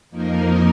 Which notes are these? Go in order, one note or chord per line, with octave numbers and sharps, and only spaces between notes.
F2 F3 A#3 D#4 A#4